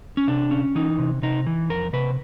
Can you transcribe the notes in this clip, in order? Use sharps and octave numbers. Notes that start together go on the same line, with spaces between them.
C#4
C3 D4
C#4
E3 D#4
C3
C3 D#4
E3
F2 A#4
C3 B4